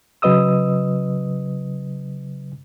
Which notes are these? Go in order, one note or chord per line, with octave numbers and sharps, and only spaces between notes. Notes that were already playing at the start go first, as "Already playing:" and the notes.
C#3 F#3 B4 D#5 D#6 E6